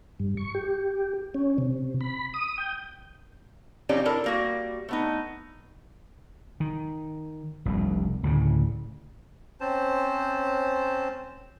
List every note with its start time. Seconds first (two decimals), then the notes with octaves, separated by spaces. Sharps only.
0.20 G2
0.37 C#6
0.55 G4
1.34 C#4
1.58 C3
2.01 B5
2.34 D#6
2.58 G5
3.89 F3 C4 C#4 D#4 G4 D5
4.05 D4 E4 A4 A#4
4.24 G3 A#3 F#4
4.88 A3 B3 D#4
6.60 D#3
7.65 F1 C2 G2
8.23 D2 A2 C#3
9.60 C4 C#4 C5 A5